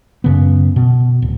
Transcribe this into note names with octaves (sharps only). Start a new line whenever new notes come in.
F#2 C#3 B3
B2
D1